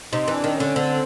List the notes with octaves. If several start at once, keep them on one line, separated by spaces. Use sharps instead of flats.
C3 D#4
E3
D4
D#3
C#4
D3
D3 C4